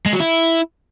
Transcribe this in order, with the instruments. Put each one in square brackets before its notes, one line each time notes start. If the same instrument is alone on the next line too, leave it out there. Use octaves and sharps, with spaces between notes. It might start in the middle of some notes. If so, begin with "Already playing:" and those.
[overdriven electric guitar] G#3
F#3
E4